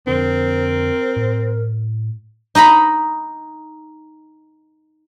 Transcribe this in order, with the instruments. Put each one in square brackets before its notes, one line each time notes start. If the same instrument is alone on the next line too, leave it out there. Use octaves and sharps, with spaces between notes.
[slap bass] F2 D3 D4 [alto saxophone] C4 [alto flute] A#4
[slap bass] A2
[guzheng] D#4 D#5 A#5 B5